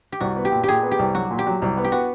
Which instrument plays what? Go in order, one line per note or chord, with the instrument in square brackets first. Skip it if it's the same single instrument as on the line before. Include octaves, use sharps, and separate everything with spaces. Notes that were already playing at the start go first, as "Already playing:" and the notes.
[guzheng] G4
[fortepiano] C2 [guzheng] F#4
[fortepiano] B3
[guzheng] G4
[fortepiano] A#2
[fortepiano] A#2 [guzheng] G4 G#4
[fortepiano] B3
[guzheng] G4
[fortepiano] C2
[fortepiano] F#3 [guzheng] F#4
[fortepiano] A#2
[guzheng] G4
[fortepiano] F#3
C2
B3
[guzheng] G4
[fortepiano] B3 [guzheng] F#4